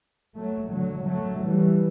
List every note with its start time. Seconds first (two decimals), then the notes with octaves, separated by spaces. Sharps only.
0.36 F#3 A3
0.70 D3 F#3
1.05 F#3 A3
1.40 E3 G3